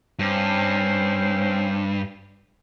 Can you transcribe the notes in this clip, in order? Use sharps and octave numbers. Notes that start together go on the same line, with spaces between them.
G2 C4 C#4 C5